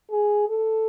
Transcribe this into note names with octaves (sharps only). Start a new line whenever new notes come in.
G#4
A4